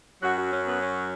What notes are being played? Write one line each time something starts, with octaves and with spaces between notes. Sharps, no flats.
F#2 F#3 F#4
F#4
C#4
B3
C#4